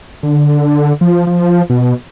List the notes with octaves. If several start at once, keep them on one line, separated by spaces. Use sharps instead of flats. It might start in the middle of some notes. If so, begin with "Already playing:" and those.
D3
F3
F3
B2